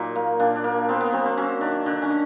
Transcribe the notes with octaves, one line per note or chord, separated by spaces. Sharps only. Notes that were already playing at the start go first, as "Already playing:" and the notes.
Already playing: A#2 F#3 D#4
A#3
A#2 D4
D4
A#3
B3 C4
B3
F#3 C4
C4
F#3 C#4
D#3 D4
D3 D4
C#4
D3